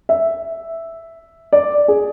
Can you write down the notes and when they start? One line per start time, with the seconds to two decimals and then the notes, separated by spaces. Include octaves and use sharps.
0.09 E5
1.53 D5
1.88 G#4